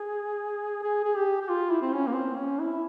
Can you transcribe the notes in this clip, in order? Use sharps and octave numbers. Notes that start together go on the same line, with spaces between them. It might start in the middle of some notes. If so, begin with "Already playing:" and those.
Already playing: G#4
G#4
G#4
G4
G4
F4
E4
C4
C#4
A#3
C4
C#4
E4